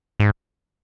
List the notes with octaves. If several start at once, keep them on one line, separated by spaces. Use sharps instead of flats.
G#2